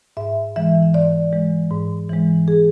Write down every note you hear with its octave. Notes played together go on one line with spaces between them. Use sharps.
G#2 E5
E3 G#3 E5
G#2 D5
E3 G#3
G#2
E3 G#3
G#4